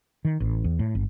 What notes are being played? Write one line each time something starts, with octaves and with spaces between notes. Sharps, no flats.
D#3
A1
E2
A2
G1